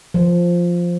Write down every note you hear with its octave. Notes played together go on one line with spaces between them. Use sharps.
F3